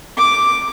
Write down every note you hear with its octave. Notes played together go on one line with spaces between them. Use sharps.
D6